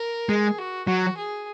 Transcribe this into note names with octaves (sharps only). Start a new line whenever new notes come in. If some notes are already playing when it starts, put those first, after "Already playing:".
Already playing: A#4
G#3 G#4
F#4
F#3 F#4
G#4